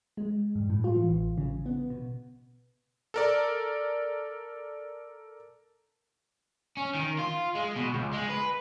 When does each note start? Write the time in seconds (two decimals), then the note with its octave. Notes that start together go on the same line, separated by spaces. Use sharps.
0.17 G#3
0.55 G2
0.70 A2
0.84 F4
0.95 E3
1.11 A1
1.38 C#3
1.66 B3
1.90 B2
3.14 A4 A#4 D5
6.77 C#4
6.95 D#3
7.18 F4
7.55 G#3
7.76 B2
7.94 C#2
8.14 G#3
8.30 B4